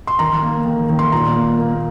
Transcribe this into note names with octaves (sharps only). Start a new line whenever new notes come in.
C6
D#3 A#5
A#3
D#3
D#3
C6
A#2 A#5
A#3
A#3